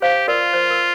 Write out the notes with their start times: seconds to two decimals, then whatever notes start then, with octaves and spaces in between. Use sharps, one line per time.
0.02 G4 C5 F5
0.28 F4 A#4 D5
0.53 C5
0.70 A#4